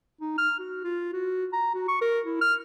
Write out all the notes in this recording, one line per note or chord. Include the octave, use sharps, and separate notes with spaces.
D#4
F6
F#4
F4
F#4
A#5
F#4
C#6
A#4
E4
F6